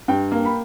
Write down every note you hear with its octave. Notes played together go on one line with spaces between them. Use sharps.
G2 G5
A#3
B5